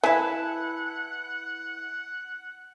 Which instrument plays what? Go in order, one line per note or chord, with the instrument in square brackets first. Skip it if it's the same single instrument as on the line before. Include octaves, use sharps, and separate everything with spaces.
[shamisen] E3 [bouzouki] E4 B4 A5 [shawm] F#5